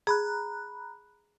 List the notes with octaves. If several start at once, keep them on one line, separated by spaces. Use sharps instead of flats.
G#4 A#5 B5 F#6